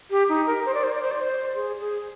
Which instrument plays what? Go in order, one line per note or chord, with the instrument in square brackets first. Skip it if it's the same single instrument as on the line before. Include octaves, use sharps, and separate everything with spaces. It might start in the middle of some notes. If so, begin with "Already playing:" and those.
[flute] G4
D#4
A#4
C5
D5
C5
D5
C5
D5
C5
G#4
G#4